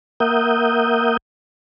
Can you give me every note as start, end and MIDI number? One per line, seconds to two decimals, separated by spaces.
0.20 1.17 58
0.20 1.17 70
0.20 1.17 76
0.20 1.17 78
0.20 1.17 87
0.20 1.17 91